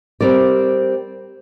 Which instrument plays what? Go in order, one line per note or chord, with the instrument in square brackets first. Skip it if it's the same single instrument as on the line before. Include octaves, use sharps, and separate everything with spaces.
[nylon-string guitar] G3 C4 A#4 D5